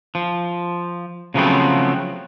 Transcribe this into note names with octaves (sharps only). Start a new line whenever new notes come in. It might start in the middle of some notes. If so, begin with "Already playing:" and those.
F3
C#3 F3 F#3 A3 B3 C4